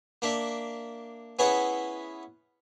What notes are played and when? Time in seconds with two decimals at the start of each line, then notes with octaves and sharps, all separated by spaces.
0.22 A#3 D4 E5
1.39 B3 C#4 E4 G#4 B4